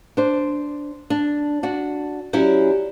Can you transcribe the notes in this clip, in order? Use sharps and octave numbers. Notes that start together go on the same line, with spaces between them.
D4 C5
D4
D4 F#4
F#3 C#4 E4 G4 D5